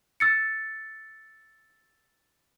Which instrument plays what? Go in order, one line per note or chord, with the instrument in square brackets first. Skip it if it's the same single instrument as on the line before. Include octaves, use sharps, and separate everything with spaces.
[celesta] E6 A6 C#7